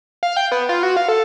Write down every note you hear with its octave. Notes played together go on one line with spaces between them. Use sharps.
F5
G5
B3
F4
F#4
F5
A4